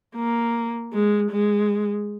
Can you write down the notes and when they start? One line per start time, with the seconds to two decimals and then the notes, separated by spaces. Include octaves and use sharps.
0.15 A#3
0.93 G#3
1.31 G#3